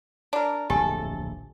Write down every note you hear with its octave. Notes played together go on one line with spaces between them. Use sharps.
D4 A#4
D1 A#1 F2 G4 A4 G#5